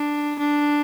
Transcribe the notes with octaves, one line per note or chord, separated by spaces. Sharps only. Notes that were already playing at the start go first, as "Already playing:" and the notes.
Already playing: D4
D4